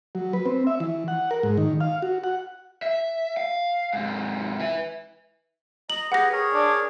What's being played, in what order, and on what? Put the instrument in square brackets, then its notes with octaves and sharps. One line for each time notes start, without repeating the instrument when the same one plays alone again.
[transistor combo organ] F#3
B4
C4
E5
E3
F#5
A#4
G#2
D#3
F5
F#4
F#5
[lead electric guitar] E5
F5
G#2 C3
B4 E5
[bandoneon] D#5 A#5 [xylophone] F#7
[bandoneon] G4 G#4 B4 [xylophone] F#5 A#6
[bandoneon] G#4 A#4 C#5
[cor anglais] D4